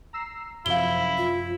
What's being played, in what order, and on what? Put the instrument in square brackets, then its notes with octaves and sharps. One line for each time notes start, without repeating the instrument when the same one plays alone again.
[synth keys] A#5 E6 C7
[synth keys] F#2 C3 F3 [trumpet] E4 [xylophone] F5 G7
[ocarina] F4